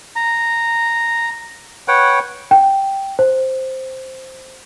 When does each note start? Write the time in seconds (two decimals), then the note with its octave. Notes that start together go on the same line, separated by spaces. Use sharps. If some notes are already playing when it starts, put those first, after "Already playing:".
0.16 A#5
1.88 B4 C#5 F#5 G5
2.51 G5
3.19 C5